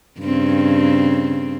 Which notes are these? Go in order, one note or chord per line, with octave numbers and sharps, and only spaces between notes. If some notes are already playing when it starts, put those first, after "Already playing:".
G2 C#3 C4